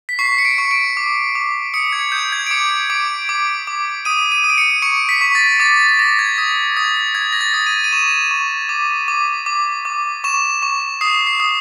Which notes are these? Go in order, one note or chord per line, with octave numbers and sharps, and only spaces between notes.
B6
C#6 C7
C#7
D7
C#6
D7
D6
D6
D#6 C#7
G#6
D#6 G6
G#6
D7
D6 C#7
D6 D7
D6
D6
D#6 D#7
D#7
D#6
D7
C#7
C#6 C#7
B6
C#6
A6
D6 A6
A6
D6 A#6
G#6
D#6
D#6 G#6
D#6 G#6
A#6
A6
D#6
D#7
D#7
C#6 E7
C#6
D6
D6
D6
D6
C#6 E7
C#6
D#6 C7
C7
D#6